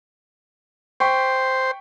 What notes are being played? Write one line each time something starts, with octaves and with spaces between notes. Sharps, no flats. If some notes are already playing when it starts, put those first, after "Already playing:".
C5 G5 C#6 B6